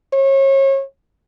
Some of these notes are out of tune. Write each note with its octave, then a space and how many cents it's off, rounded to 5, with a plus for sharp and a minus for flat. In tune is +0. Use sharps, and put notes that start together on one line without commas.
C#5 -35